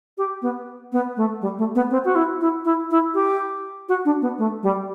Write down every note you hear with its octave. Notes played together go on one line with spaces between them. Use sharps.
G4
B3
B3
A3
G3
A3
B3
C4
F#4
E4
E4
E4
E4
G4
F#4
D4
B3
A3
G3